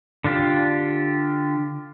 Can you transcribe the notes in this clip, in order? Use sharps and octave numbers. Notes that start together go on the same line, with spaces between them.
D3 D4 F4 G4